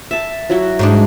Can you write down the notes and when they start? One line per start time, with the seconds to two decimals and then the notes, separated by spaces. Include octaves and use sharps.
0.11 E5 A5
0.50 F#3 E4 F#4
0.79 G#2 G#3 D4